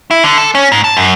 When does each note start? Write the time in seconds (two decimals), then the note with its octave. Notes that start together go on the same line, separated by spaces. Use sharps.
0.11 E4
0.24 D3
0.38 A4
0.55 C#4
0.72 G#2
0.84 A5
0.97 F#2